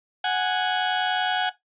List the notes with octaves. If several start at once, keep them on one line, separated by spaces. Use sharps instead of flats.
F#5 G#5